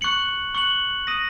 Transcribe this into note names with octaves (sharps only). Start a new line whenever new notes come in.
C#6 F#6 C#7 F#7
C#6 F#6 C#7 F#7
D#6 A#6 D#7